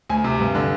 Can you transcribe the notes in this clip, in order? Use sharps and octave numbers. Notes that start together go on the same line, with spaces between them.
D2 G#5
C3
G2
D3